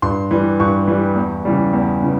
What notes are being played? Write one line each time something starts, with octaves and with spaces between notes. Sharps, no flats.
G2 C6
E3 G3
G2 C#6
E3 G3
E2
C#3 E3 G3
E2
C#3 E3